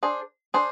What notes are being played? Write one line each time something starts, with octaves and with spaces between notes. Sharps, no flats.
D4 G#4 C5
D4 G#4 C5